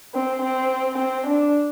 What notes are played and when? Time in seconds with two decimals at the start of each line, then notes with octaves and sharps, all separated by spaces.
0.14 C4
0.42 C4
0.98 C4
1.27 D4